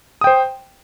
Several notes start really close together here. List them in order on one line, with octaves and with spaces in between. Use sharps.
D#6 G5 C5